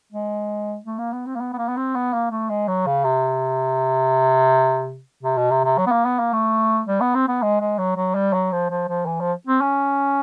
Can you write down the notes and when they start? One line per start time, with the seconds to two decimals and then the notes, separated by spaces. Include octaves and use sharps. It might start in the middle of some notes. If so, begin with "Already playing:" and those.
0.12 G#3
0.85 A3
0.99 A#3
1.12 B3
1.26 C4
1.35 A#3
1.40 B3
1.53 B3
1.58 A#3
1.68 B3
1.77 C4
1.95 B3
2.13 A#3
2.31 A3
2.50 G#3
2.68 F#3
2.86 C#3
3.04 C3
5.23 C3
5.37 B2
5.51 C3
5.64 C3
5.78 F#3
5.87 B3
5.91 A#3
6.05 B3
6.19 A#3
6.33 A3
6.87 G3
7.00 B3
7.15 C4
7.28 B3
7.42 G#3
7.60 G#3
7.78 F#3
7.97 F#3
8.15 G3
8.33 F#3
8.52 F3
8.70 F3
8.88 F3
9.06 E3
9.20 F3
9.47 C4
9.61 C#4